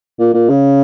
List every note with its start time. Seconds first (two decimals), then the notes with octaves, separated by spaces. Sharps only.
0.20 A#2
0.34 A#2
0.50 C#3